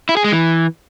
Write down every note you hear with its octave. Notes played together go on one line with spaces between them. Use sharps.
E4
G#4
G#3
E3